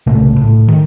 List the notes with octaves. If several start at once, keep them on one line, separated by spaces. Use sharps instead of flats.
C2 A#2 C#3 A3
A2
D#3